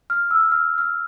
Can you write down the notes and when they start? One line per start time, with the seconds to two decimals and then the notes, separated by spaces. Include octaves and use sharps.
0.10 F6
0.31 E6
0.52 F6
0.78 F6